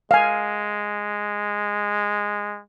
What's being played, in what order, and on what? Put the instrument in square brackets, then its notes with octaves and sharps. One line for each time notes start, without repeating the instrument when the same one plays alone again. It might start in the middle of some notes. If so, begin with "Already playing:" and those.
[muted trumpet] G#3 [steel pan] F5 G#5